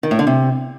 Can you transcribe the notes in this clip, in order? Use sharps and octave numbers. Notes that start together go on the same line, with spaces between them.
D#3
A2
D3
C3